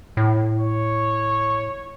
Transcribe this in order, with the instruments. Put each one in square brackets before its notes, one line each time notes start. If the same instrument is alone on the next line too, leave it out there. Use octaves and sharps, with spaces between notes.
[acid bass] A2
[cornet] C#5